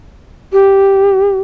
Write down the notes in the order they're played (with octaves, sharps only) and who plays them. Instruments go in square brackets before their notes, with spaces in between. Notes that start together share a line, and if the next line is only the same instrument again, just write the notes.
[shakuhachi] G4